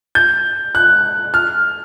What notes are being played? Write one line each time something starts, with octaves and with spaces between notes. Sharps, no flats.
G6
F#6
F6